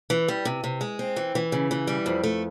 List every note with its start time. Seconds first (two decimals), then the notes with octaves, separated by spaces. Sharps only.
0.10 E3
0.28 G3
0.45 C3
0.64 C3
0.81 G#3
0.99 C4
1.16 E3
1.35 E3
1.52 C#3
1.71 E3
1.87 G3
2.06 F2
2.24 A3